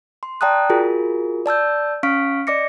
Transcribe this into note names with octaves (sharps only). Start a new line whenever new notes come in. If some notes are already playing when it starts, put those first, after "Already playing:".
C6
D5 G5 A5 A#5 D#6 F#6
F4 F#4 G#4 A#4
D5 A5 E6 G6
C#4 F5 C#6 F6 B6 D7
D5 D#5 D6 A#6 C#7